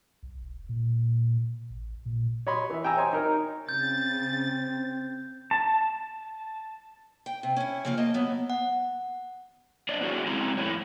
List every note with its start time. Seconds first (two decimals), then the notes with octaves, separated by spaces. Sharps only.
0.23 B1
0.41 E1
0.69 A#2
1.70 A1
2.06 A#2
2.47 C#5 D#5 B5 C6
2.70 E3 E5
2.84 G5 G#5 A#5 E6
2.97 C5 C#5 D#5 G#5 C6
3.13 D#4 A#4 C#5
3.69 C#3 C4 G6 A6
5.51 A5
7.26 G5
7.43 C3
7.57 C#4 E4
7.85 C#3 F3 A#3 F4 A#4
7.97 A#3 D#5 A5
8.14 F#3 B3
8.50 F#5
9.89 D4 C5 D5 D#5
10.01 B3 D4 E4 F#4 G#4 C#5
10.27 G#3 C4 E4 A#5
10.57 F2 A2 F3 E4 C#5